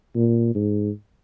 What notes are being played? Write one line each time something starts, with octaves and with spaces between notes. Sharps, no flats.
A#2
G#2